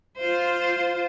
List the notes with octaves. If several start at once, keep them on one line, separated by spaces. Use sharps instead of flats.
F4 C5